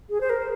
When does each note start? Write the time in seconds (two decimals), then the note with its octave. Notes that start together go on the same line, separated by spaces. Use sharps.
0.10 G#4
0.21 C5
0.30 A#4